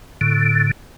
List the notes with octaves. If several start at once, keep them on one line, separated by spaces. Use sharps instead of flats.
A2 D3